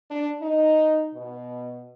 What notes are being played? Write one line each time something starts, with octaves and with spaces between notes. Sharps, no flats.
D4
D#4
B2